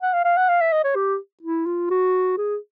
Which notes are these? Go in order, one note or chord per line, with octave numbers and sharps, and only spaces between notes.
F#5
F5
F5
F#5
F5
E5
D#5
C#5
G4
E4
F4
F#4
G#4